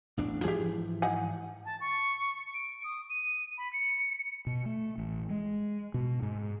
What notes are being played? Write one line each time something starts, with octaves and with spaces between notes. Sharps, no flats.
A1 E2 D4
G#2 E3 F3 G4 G#4
D#4 F#5 G#5
A5
C#6
D7
D#6
D#7
B5
C#7
B2
A3
A1
G#3
B2
G#2